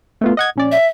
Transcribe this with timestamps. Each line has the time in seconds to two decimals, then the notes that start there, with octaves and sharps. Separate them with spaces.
0.21 A3 B3 F4
0.37 D#5 F#5 G#6
0.56 A#1 C#4 D5
0.72 E5